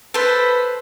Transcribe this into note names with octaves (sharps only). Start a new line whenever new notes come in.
A4 B4 C5